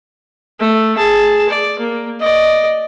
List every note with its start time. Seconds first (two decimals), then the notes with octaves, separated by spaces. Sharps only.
0.60 A3
0.98 G#4 A5
1.49 D5
1.79 A#3
2.20 D5 D#5